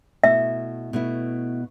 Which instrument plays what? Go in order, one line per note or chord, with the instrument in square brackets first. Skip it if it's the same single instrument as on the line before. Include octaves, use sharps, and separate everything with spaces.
[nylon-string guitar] B2 A3 E4 [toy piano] E5
[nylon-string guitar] B2 A3 E4